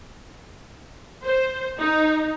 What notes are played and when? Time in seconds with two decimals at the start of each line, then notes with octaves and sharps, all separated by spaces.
1.24 C5
1.79 D#4